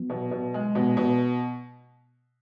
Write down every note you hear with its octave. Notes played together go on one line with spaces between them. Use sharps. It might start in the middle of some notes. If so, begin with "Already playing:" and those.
Already playing: F#3 B3
B2
B2
G#3
B2
B2